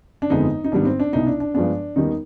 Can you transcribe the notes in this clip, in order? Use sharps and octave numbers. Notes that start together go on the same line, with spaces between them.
D4
G1 F2 D3 G#3 B3 D#4
D#4
G#1 G#2 G3 B3 D4
C4
D4
C2 B2 B3 D#4
D4
D4
G2 F3 G#3 B3 D4
D#2 D#3 G3 B3 D#4